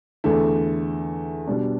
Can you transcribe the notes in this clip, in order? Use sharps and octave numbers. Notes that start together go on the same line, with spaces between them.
E2 D3 A3
B2 G3 D4